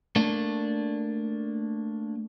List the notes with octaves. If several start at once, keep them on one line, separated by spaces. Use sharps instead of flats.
A3 A#3 D4